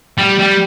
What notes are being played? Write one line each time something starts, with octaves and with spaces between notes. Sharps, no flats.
G3
G3